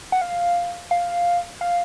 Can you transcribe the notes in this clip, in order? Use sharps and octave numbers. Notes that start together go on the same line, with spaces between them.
F#5
F5
F5
F5